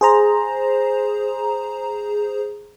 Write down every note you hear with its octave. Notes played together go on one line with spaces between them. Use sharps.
G#4 C5 A#5